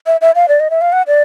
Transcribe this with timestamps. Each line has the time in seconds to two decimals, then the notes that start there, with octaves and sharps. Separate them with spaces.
0.07 E5
0.21 E5
0.35 F5
0.48 D5
0.60 D#5
0.70 E5
0.81 F5
0.92 F#5
1.07 D5